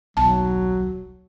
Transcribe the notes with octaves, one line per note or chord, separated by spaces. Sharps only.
D#1 B1 F#3 A5